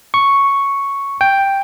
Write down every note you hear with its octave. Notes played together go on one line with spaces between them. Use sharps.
C#6
G5